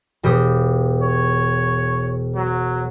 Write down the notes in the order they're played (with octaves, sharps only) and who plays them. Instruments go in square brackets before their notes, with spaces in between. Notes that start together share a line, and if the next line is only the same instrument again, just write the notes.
[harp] E1 G4 D#6
[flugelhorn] C#5
F#3